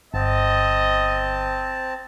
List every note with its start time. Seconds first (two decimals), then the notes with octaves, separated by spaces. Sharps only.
0.14 G1 C4 D#5 A5